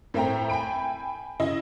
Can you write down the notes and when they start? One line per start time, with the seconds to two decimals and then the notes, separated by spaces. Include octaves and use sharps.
0.14 A2 A3 C4 E5 G5 A#5
0.49 G5 G#5 B5 D7
1.40 C#3 E4 D#5